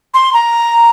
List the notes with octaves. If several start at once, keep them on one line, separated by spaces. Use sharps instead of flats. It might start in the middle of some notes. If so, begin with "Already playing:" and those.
C6
A#5